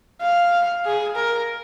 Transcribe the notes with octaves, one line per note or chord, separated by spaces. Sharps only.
F5
G#4
A#4